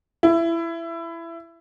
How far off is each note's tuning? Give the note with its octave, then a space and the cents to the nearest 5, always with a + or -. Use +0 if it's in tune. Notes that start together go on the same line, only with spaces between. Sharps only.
E4 +20